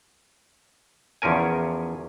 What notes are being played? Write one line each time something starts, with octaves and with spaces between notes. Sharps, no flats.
E2 F3 C#4 A#4 G#5